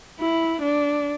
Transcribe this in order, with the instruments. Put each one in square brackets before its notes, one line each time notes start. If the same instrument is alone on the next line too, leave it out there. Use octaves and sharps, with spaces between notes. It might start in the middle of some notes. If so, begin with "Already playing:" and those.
[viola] E4
D4